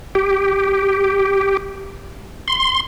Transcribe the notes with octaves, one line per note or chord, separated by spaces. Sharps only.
G4
C6